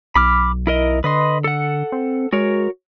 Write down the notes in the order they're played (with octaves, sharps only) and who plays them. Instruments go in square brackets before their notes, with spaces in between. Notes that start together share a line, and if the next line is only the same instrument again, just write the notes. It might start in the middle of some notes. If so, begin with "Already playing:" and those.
[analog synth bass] B1 [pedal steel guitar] B5 D6 F6
[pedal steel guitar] E4 A#4 D#5
[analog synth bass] D3 [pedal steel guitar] B4 D#5 C6
[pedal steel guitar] A4 F#5
[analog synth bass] C4
[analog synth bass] G#3 [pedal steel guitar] F#4 A#4 C#5